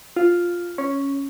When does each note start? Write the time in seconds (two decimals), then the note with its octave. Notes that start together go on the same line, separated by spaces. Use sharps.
0.16 F4
0.78 C#4